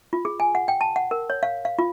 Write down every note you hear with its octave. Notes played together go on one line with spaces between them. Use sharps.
F4
G#4
G#5
F#5
G5
A5
F#5
A#4
C#5
F5
F5
F4